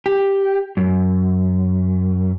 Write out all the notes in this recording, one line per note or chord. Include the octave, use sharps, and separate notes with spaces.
G4
F#2